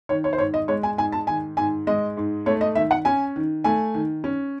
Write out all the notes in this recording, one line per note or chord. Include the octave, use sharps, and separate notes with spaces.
D#3 C#5
C#5
C5
G#2 C#5
D#5
G#3 C#5
G#5
G#2 G#5
A5
D#3 G#5
G#2 G#5
G#3 D#5
G#2
A3 C#5
D#5
D#3 E5
F#5
C#4 G#5
D#3
A3 G#5
D#3
C#4